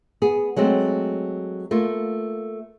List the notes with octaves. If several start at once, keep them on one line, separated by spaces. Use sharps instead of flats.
B3 G#4
F#3 G#3 A3 C4
A3 A#3 F4